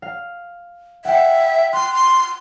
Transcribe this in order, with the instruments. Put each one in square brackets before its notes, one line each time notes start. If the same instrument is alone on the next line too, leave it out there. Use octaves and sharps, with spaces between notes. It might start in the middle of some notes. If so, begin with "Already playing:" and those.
[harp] F5
[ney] E5 [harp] F#5 G5
[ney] C6 [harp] F#6
[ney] C6